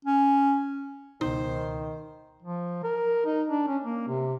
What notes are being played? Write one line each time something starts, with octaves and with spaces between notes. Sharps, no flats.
C#4
C#2 B2 D#3 D#4 C5
F3
A#4
D#4
D4
C#4
A#3
C3